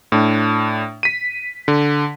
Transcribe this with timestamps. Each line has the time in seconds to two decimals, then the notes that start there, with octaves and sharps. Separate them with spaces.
0.12 A2 D4
1.03 B6 D#7
1.68 D3